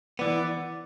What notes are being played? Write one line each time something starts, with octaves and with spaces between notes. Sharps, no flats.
E3 B3 D5